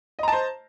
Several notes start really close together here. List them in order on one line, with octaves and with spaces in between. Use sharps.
D#5 A#5 A5 C5